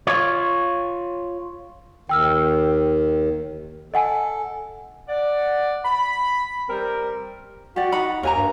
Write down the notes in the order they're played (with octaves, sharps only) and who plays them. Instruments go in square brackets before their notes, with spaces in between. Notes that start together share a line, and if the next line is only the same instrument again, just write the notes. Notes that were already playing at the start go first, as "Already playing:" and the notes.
[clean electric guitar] F4 C#5
[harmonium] D#2 D#3 [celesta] G5 E6 F6
[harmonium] A4 [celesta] D#5 F#5 G#5
[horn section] D5 F#5
B5
G3 C4 A#4
[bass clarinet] F#4 [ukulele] G4 D5
[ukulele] D#4 F#5 B5
[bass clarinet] D#2 [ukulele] A#4 G#5 A#5
[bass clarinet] G2